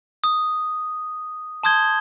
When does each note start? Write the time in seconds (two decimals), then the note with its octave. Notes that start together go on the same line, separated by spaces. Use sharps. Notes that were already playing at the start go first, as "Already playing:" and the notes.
0.24 D#6
1.63 A5 C6 D#6 G6 G#6 G7